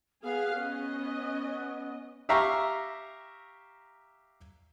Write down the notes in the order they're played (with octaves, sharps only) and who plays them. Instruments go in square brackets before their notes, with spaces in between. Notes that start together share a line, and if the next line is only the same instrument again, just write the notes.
[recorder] B3 [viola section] G#4 F5
[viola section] C#4 D#5
[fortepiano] G4 E5 F5 A#5 C#6